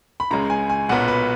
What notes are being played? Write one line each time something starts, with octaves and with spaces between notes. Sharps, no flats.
B5
C#2 C#3 G#3 A#5
G#5
G#5
B1 A#2 F#3 B3 F#5
B4